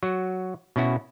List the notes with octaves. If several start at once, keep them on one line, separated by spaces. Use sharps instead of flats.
F#3 F#4
B2 C#4 E4 F#4